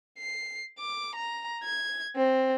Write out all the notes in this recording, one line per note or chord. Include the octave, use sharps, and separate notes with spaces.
C7
D6
A#5
G#6
C4